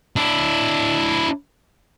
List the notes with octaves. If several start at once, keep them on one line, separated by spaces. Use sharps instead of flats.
D4 E4